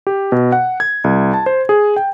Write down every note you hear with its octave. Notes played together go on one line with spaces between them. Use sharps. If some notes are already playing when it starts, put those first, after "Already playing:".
G4
B2
F#5
G#6
C2
A5
C5
G#4
G5